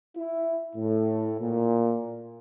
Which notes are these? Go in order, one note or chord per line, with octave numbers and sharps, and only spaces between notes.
E4
A2
A#2